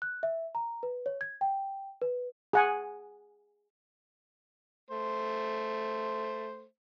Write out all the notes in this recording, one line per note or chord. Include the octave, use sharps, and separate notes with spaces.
F#6
E5
A#5
B4
C#5
G#6
G5
B4
G#4 F#5 G#5
A3 C5